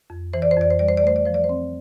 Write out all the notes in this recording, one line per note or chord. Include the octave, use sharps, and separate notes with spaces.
F2
E3 C5
D5
C5
F2 D5
C5
G3 D5
C5
D5
A3 C5
D5
F3 C5
D5
C5
C4